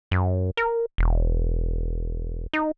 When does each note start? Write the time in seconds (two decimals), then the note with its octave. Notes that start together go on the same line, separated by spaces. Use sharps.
0.11 F#2
0.57 A#4
0.98 E1
2.53 D#4